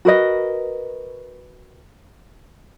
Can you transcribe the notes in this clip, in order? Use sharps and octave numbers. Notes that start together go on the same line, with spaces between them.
F#4 A#4 B4 D#5